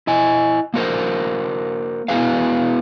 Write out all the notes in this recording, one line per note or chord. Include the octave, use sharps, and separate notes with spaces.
E4 D#5 G#5
A#3 F#4 A#4 C5
B3 E4 F#4 G#4 B4 F5